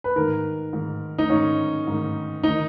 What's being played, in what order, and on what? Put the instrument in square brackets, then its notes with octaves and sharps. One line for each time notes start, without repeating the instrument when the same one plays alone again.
[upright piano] B4
G#2 D#3 A#4
G#2 D#3
D#4
G#2 D#3 C#4
G#2 D#3
D#3 D#4